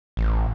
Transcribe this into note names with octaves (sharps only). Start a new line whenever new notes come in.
A1